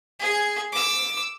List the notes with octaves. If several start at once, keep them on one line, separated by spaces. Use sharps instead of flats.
G#4 G#5
D6 E6